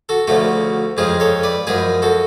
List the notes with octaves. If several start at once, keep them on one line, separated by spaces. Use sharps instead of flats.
F#4 A4
D2 C#3 F3 A3 F#4 A4
F2 C#3 F3 G#3 F4 G#4
A4 C#5
B4 D5
F#2 F3 G#3 G#4 B4
F#4 A4